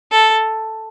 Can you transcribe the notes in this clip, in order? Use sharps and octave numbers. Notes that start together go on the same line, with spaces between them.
A4